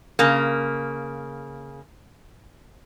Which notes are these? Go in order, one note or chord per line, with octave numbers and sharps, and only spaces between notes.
C#3 A#3